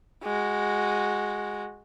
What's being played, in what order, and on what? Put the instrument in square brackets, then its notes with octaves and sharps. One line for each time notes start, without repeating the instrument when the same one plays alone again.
[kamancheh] G#3 F#4